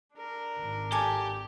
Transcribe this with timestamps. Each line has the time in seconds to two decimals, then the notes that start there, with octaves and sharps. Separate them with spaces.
0.14 D4 A#4
0.55 G#1
0.92 G4 A4 G#5 D6